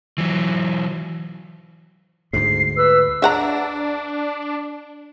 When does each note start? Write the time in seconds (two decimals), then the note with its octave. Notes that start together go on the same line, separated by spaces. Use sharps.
0.18 E3 F#3
2.33 D2 G#2 C7
2.77 B4 E6
3.22 D4 E5 F#5 A#5